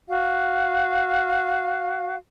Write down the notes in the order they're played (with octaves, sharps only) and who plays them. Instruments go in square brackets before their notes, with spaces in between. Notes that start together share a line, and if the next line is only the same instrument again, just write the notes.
[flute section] F#4 F5